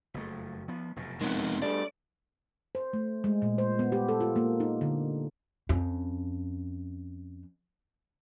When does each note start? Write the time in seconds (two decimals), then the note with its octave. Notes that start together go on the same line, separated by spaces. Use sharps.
0.14 F#1 F2 A3
0.68 F3 B3
0.96 F1 F#2 B2
1.21 F2 D#3 G#3 B3
1.62 G3 A3 D4 D5
2.75 C5
2.93 A3
3.24 G#3
3.42 A#2
3.58 C5
3.79 B3
3.92 G4
4.09 A4
4.20 F4
4.36 A#3
4.60 D#4
4.81 D3
5.69 F2 C#4